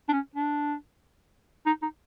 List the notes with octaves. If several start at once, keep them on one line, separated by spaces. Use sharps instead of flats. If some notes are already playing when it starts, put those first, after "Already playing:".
D4
C#4
D4
D#4
D#4